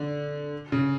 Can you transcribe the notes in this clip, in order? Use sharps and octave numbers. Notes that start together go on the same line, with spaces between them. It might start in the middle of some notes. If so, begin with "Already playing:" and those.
Already playing: D3
C#3